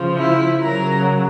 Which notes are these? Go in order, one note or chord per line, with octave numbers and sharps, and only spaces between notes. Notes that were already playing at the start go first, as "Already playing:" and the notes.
Already playing: C#3 F3
E4
C#3 F#3 A#4